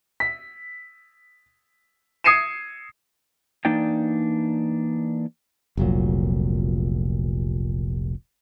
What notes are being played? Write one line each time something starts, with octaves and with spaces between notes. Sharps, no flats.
B6
D#6 G#6 C7 C#7 D#7 E7
E3 A#3 D4 D#4 D5 G5
F1 C2 A#2 F#3